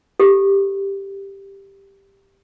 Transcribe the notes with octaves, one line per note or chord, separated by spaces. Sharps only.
G4 A4